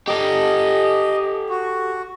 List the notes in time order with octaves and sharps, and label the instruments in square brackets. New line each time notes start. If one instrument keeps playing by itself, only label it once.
[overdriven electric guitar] G4 A4 [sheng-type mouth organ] D#5
[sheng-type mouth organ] F#4